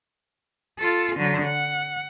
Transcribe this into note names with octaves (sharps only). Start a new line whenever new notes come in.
F4 A4
D3 F#3
F#5